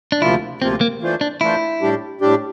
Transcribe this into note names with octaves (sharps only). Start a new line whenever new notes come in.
D4
D2 C3 F3 A#3 E4 F4
D2 C3 F3 A#3 C4 F4
A#3
E3 A3 D4 F4 C5
D4
E3 A3 D4 E4 F4 C5
A2 G3 D4 G4
A2 G3 D4 G4